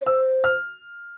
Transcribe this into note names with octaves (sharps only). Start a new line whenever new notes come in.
C#5
C5 E6
F6